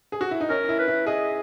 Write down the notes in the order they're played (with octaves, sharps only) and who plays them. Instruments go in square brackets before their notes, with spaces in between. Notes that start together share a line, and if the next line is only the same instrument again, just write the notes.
[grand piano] G#4
F#4
E4
D#4
[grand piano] C#4 [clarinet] A#4
[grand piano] E4
[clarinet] B4
[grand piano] E4
[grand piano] G#4 [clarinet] D#5